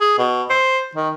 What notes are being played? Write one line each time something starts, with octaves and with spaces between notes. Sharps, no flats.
G#4
B2
C5
D#3